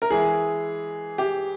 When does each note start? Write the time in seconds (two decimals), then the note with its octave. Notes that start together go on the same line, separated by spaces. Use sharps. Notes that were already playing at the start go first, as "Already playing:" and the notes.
0.02 A#4
0.10 E3 G#3 E4 G#4
1.18 G4